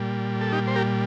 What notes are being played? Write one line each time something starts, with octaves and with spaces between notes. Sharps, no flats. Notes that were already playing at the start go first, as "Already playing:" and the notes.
Already playing: A#2 G3
A4
D#4 G4
C5
G4 A#4